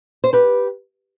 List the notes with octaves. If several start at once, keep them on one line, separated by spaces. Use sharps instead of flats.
C5
G4 B4